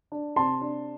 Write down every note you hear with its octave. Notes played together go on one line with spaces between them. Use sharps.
D4
C3 A5 C6
D4